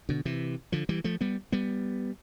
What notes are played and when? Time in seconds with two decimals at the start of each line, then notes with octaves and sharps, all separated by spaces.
0.09 B2 D3
0.25 C3 E3
0.72 D3 F3
0.89 E3 G3
1.04 F3 A3
1.21 G3 B3
1.52 G3 B3